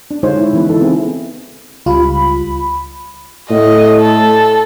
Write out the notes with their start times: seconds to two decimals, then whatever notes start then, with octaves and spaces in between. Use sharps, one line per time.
0.11 D4
0.23 D3 G#3 D#4 F4 C5 C#5
0.39 E4
0.53 C#3 E3 G#3 B3 B4
0.69 E3 D#4 A4
0.81 B3 C4 E4 F4 G#4
1.86 C#2 G3 F4 B5
3.50 A2 D#5
4.00 A4